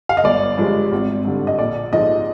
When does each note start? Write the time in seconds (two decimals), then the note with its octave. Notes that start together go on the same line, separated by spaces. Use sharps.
0.09 F5
0.17 D#5
0.24 G1 D5
0.58 G2 F3 G#3
0.92 G#1
1.25 G2 D3
1.47 D#5
1.59 A#1 D5
1.93 G#2 F3 G#3 D#5